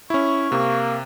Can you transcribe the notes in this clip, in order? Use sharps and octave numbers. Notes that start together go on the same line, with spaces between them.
C#4 E4 C#6
C3 A#3